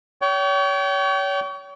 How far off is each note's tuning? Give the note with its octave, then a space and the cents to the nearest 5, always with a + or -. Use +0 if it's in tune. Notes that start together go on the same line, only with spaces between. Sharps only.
C#5 +35 G5 -30